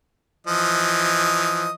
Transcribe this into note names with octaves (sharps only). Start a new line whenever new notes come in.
E3 F3 D#5